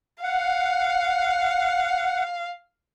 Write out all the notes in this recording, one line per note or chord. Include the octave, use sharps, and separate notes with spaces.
F5 F#5